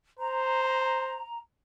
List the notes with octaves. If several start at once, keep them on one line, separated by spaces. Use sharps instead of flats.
C5 A#5